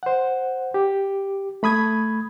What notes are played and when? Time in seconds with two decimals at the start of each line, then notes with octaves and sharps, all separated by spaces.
0.03 C5 F#5
0.74 G4
1.63 A3 B5 D#6 G#6